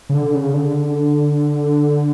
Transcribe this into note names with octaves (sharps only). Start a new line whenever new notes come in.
C#3
D3
C#3
D3